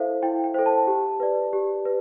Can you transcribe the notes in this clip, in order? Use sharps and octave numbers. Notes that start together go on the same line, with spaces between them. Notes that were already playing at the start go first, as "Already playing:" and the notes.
Already playing: E4 A4 C5 E5 F5
E4 G5
G5
A4 C5
A5
G4
B4 D5
G4
B4